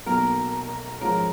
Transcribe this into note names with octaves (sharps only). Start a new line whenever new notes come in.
B1 B2 A#3 A#4
G#2 F3 G#3 C#4 F4 A#4